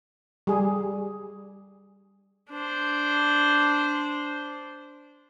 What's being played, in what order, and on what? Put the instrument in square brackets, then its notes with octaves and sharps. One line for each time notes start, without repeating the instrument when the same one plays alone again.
[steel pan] G3 G#4
[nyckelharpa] D4 C5